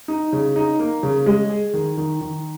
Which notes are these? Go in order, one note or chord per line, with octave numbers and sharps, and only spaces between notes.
D#4
C#3
D#4
A#3
C#3
G#3
G#4
D#3
D#3
D#3